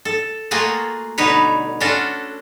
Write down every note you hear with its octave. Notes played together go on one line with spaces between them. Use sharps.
A4
A3 A#3 F4 F#4 G#4
B2 D3 G3 D#4 B4 C#5
C#4 D4 F4 F#4 A4